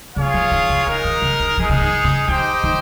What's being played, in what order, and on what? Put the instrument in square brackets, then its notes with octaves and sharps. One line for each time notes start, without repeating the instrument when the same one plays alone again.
[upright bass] C#3 [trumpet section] F4 G#4 C#5 F5
[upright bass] F3
D#3
C#3
[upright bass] C#3 [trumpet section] G#3 D#4 A#4
[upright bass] D#3
C#3
D#3
[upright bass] F3 [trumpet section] G#3 D#4 G#4
[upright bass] C#3
D#3
C#3
[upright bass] D#3 [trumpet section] D#4 G4 C5 D#5 G5
[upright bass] D#3